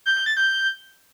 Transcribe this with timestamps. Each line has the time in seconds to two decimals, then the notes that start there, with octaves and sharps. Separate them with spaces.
0.06 G6
0.16 G6
0.26 A6
0.37 G6